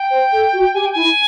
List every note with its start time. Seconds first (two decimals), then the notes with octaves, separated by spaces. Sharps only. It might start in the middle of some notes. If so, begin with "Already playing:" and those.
Already playing: G5
0.10 C5
0.32 A4
0.53 F#4
0.74 G4 G#5
0.84 G5
0.92 E4 G#5